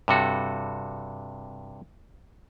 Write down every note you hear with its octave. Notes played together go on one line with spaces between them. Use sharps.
G2 C3 F#4 A4